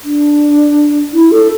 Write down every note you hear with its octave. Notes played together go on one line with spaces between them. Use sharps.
D4
E4
A4